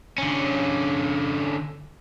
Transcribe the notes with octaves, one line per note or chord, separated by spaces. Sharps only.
D3 C#4